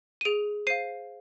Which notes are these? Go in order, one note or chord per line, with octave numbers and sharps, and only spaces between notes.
D#7
G#4 D7 F7
C5 F5 C7 D#7